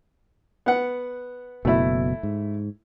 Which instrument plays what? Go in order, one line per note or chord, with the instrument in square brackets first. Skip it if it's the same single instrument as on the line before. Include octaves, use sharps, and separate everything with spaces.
[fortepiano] B3 F#5
[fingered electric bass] F#1 B2 [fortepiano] A3 E4
[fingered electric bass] G#2